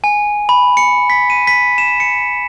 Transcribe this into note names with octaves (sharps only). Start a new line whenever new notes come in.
G#5
B5
C#7
B6
D#7
B6
E7
C#7